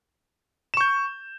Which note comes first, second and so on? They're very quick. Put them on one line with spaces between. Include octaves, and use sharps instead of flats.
E7 C#6 G6